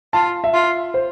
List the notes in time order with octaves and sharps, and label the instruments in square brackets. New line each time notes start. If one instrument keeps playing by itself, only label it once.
[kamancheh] F4 [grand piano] A5
[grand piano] E5
[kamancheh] F4
[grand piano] C5